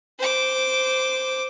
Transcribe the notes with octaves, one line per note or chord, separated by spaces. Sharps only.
C5 D6